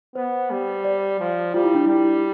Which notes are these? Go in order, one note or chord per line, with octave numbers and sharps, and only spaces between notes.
B3 C5
G3
D5
F3
G3 F4
E4
D4
G3 E4